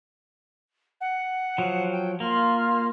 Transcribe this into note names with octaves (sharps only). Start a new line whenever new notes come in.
F#5
F3 F#3
G5
A#3 F4 F6